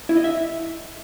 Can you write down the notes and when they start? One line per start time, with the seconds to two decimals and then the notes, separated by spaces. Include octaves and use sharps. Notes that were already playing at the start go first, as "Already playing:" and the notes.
0.09 E4
0.17 D#5
0.24 E5